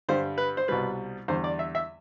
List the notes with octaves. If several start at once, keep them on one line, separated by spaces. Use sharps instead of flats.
G2 D3 G3 C5
B4
C5
C2 B2 G3 B4
E2 D3 G3 C5
D5
E5
E5